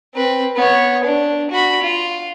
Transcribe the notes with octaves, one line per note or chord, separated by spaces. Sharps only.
C4 B4
B3 C#5
D4
F#4 B5
F4